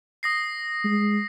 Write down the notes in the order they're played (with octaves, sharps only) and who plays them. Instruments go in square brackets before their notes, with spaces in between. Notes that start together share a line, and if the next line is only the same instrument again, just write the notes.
[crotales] D#6 A#6 C7
[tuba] G#3